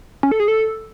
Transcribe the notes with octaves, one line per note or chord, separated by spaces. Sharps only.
C#4
A4
G#4
A4